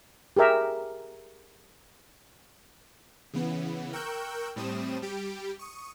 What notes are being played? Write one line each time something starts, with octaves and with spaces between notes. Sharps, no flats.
G4 G#4 A#4 E5
C#3 E3 B3
A#4 G5 C#6 E6 F#6 G6
A2 G3 C4 D#6 E7
G3 G4 D7
C#6 D#6